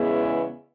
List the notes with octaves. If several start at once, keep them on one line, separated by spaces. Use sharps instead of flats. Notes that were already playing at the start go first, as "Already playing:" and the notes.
Already playing: E2 C#3 G#3 B3 E4